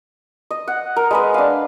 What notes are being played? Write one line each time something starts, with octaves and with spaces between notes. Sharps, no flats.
D#5
F#5
A#4
G#3 B4 D#5
D4 F5